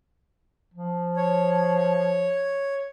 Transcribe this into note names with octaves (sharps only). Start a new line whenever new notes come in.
F3
C#5